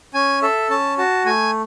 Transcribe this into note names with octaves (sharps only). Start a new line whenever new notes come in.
C#4 G#5
A4 E5
C#4 A5
F#4 A5
A3 G#5